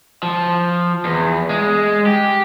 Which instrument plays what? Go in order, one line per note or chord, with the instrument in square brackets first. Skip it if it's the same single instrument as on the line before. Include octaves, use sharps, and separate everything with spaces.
[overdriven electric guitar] F3
E2
G#3
G4